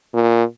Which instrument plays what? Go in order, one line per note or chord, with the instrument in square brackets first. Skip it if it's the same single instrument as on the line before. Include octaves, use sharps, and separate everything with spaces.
[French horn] A#2